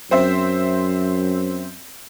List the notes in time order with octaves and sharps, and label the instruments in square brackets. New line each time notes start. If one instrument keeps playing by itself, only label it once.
[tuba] F#2 [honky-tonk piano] C4 C5 E5